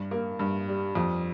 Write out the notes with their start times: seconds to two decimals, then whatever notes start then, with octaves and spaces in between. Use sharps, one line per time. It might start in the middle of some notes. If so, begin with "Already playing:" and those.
Already playing: G2 G3
0.11 A#3
0.39 G2
0.68 G3
0.95 F2